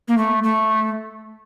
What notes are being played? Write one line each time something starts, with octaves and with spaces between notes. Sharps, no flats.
A#3
A3
A3